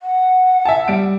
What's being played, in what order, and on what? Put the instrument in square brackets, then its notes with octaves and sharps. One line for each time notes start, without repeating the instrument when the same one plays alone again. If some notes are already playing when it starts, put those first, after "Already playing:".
[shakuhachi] F#5
[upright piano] E5 G#5 A5
G3 D7